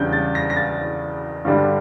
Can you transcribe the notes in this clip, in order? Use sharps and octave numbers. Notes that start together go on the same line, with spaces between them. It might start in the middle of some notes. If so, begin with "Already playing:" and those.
Already playing: E2 C#3 G3 D4 G6
A6
A#6
A#6
A6
G2 D3 G3 D4